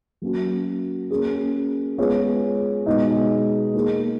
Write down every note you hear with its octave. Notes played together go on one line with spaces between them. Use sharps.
F#3 A#3 C#4 F#4
A#3 C#4 G#4
G#3 B3 F4 G#4 C#5
B2 G#3 D#4 G#4 D#5
A#3 D#4 G#4